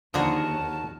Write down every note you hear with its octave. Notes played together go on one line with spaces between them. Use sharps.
D#2 D3 F3 F#4 G#4 A#4 A5